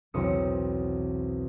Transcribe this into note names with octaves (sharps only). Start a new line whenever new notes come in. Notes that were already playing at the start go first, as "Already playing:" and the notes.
B1 E2 C4 D#6 C#7